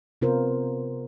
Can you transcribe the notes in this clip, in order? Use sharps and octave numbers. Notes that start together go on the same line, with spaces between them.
C3 B3 F4 A#4 C5